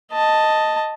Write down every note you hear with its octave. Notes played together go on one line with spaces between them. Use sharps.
D#5 A5